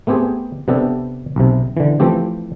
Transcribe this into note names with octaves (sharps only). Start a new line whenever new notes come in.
A3 B3 C4 G4 G#4
C3 B3 D4 G4 A4
B1 C3
D3 E3
E3 F3 A3 C4 G4